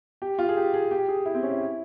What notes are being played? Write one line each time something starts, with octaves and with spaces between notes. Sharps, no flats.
G4
F4
G#4
G4
G#4
G4
G#4
E4
C4
C#4
E4